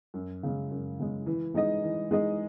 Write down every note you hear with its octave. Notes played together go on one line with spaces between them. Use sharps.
F#2
C#3 G#3
F#2
C#3 G#3
E3
G#3 D#4 G#4 D#5
E3
G#3 D#4 G#4 D#5